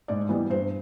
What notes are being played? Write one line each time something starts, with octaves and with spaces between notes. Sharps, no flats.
G#2 D5
E3 G3 B3
G2 C5